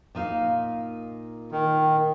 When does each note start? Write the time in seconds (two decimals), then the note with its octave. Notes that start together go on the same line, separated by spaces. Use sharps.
0.15 A#2 D#4 F5
1.52 D#3